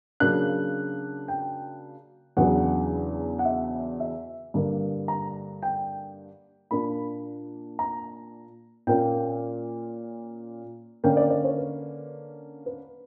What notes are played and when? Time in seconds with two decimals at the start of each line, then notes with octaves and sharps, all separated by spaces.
0.20 C#3 F#3 A#3 D4 F#6
1.28 G5
2.37 E2 C#3 F#3 B3 D4 F#5
3.39 F#5
3.45 E5
4.00 E5
4.54 G2 D3 A#3
5.08 A#5
5.63 G5
6.71 A#2 A#3 D4 B5
7.79 A#5
8.87 A#2 A#3 C#4 G5
11.04 D3 A#3 C#4 G5
11.17 D5
11.30 D5
11.45 C#5
11.58 B4
12.66 B4